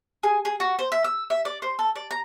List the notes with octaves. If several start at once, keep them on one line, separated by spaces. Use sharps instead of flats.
G#4
G#4
F#4
C5
E5
E6
E5
D5
C5
A4
D5
A#5